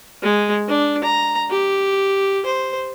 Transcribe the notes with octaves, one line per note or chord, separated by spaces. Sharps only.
G#3
D4
A#5
G4
C5